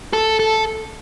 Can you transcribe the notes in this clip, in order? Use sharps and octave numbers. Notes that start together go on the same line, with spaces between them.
A4
A4